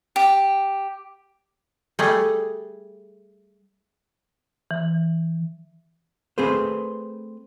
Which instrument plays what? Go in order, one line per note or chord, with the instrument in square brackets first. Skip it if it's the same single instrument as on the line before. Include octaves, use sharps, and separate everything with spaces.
[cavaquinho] G4
[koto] G3 A3 G#4
[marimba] E3
[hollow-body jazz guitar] A3 C4 G#4 B4 C5